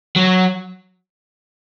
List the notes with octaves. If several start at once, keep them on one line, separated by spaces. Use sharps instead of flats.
F#3